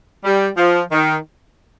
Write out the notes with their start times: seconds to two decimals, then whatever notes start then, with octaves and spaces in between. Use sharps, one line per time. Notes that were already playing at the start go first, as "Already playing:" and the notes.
0.25 G3
0.57 F3
0.92 D#3